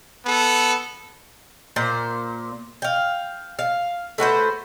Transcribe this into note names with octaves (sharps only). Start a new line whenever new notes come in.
B3 A4
A#2 C5
F5 G5
F5
A3 F#4 B4 C5